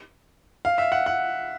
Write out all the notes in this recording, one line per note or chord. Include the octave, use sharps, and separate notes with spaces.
F5
E5
F#5
F#5